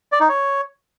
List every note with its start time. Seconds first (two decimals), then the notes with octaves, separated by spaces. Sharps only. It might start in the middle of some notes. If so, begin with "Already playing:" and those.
0.12 D5
0.20 D#4
0.29 C#5